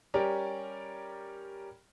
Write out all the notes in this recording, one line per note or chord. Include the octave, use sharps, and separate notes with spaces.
G3 C#4 G4 A#4 D5